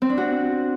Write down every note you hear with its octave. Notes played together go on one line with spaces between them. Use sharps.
C4
D4
F#4